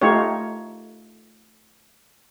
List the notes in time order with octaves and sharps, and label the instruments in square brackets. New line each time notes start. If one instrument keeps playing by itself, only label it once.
[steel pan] A3 D#4 F4 G4 C#5